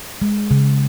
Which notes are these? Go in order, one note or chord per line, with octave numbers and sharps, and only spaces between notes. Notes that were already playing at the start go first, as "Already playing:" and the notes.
G#3
C#3